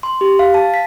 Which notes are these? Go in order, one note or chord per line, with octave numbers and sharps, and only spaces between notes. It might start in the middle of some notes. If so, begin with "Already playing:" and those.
C6
G4
F5
A5
B6